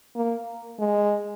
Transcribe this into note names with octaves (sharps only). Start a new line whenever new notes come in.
A#3
G#3